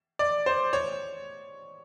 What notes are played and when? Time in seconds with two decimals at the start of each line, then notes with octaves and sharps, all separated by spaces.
0.19 D5
0.46 C5
0.73 C#5